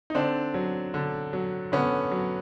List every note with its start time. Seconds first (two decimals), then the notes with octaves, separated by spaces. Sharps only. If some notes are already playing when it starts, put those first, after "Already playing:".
0.10 D#4
0.15 D3 C4 D4
0.54 F#3
0.94 D3
1.33 F#3
1.72 D3 B3 C#4
2.12 F#3